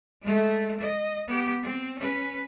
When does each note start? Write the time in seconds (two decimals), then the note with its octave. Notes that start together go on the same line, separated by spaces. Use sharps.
0.22 G#3 A3
0.81 D#5
1.27 B3 G4
1.62 C4
1.99 C#4 B4